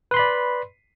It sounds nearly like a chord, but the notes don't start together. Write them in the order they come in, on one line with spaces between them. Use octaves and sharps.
B4 C6 B5 D5